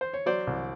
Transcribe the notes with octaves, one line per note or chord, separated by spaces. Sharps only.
C5
C#5
F#3 C5 D5
C2